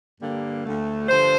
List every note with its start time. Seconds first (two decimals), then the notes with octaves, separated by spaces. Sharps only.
0.20 G2 D3 G3 A#3
0.65 D2 D3 A3
1.09 G2 D3 F3 C5